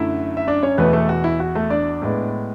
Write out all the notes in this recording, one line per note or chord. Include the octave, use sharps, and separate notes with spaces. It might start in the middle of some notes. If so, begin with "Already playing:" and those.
Already playing: F#2 D3 F#3 A3 E4 E5
E5
D4 D5
C#4 C#5
E2 B2 A3 B3 B4
A3 A4
F#4
E4
F#4
A3 A4
D4 D5
A2 G#3 B3